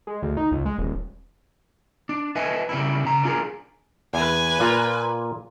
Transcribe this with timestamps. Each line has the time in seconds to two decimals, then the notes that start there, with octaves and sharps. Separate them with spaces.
0.07 G#3
0.22 D2
0.37 D#4
0.51 C#2
0.66 G#3
0.79 D#1
2.09 D4
2.36 B4 D#5 E5 G#5
2.69 C#3 G3 E4
3.05 C#3 A#5
3.23 D4 F4 G#4 A#4
4.14 E2 B4 G#5
4.60 A#2 F4 A#5